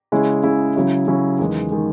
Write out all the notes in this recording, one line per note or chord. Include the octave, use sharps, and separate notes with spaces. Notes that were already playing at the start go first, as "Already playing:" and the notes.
C#3 G#3 C#4 E4 G#4
C#3 G#3 C#4 E4 G#4
C#3 F#3 C#4 E4
C#3 F#3 C#4 E4
E2 D#3 G#3
D#3 G#3